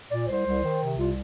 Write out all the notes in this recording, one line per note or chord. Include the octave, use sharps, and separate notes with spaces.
A#2 D5
C2 C5
C2
D#3
C3
C2 F4